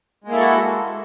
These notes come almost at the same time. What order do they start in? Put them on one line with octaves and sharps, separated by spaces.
G#3 A#3 E4 A4 F#4